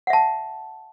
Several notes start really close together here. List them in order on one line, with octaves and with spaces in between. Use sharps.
F#5 E5 A5